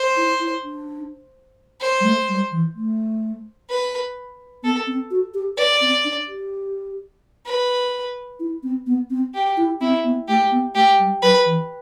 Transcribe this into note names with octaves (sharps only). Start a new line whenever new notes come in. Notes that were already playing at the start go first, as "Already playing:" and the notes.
Already playing: C5
E4
E4
D4
C5
G3
A3
G3
E3
A3
B4
B3 A4
C4
F#4
G4
B4 D5
C4
D4
G4
B4
E4
C4
B3
C4
G4
E4
C4 E4
B3
A3 G4
B3
A3 G4
G3
F#3 B4
E3